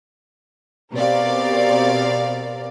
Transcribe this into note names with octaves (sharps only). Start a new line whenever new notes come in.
B2 C4 G4 A#4 D5 F5